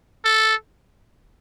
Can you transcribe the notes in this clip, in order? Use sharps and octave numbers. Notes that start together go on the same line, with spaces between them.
A4